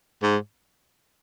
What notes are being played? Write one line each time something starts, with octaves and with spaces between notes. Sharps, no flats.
G#2